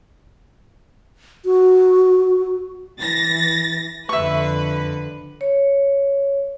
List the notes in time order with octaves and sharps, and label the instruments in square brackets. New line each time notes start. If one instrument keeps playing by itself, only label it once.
[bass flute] F#4
[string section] E3 A6 A#6
[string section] F2 D3 B4 [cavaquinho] E5 C#6
[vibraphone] C#5